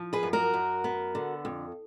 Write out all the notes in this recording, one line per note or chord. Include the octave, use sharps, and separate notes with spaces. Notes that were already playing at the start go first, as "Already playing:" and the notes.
Already playing: F3
G#4 B4
F#2
F#4 A#4
F#2
B3
D3
F2